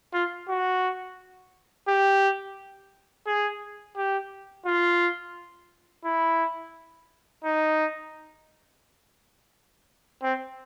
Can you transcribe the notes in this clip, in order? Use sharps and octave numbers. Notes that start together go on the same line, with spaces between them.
F4
F#4
G4
G#4
G4
F4
E4
D#4
C4